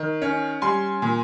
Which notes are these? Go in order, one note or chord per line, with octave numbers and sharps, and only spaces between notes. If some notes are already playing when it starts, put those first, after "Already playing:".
Already playing: D#3
C#4
G3 G#5 C6
A#2